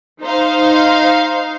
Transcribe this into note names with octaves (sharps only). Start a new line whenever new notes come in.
D#4 C5 F5